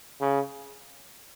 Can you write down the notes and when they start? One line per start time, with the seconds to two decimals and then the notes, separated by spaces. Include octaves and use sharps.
0.21 C#3